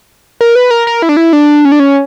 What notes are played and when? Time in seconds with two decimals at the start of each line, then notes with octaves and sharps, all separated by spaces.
0.41 A#4
0.55 B4
0.71 A#4
0.87 A#4
1.02 E4
1.09 D4
1.17 E4
1.33 D4
1.65 C#4
1.72 D4
1.80 C#4